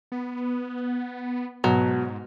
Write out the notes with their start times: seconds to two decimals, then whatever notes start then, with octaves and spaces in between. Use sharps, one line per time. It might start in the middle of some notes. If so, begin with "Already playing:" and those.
0.12 B3
1.64 G#2 B2 F#3